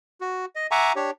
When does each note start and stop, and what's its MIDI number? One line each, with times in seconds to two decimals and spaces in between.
0.21 0.45 66
0.56 0.67 75
0.71 0.92 76
0.71 0.92 78
0.71 0.92 80
0.71 0.92 82
0.71 0.92 85
0.71 0.92 86
0.96 1.11 62
0.96 1.11 67
0.96 1.11 73